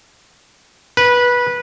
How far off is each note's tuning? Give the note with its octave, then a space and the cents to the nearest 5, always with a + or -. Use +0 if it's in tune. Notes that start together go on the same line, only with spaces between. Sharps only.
B4 -15